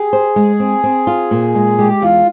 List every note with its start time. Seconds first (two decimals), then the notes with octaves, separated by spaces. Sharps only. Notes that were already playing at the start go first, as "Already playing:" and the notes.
Already playing: G4 G#4
0.13 C5
0.36 G#3
0.60 C4
0.84 C4
1.07 F4
1.31 A#2
1.55 G#3
1.78 G#3 G4
2.02 E2 F4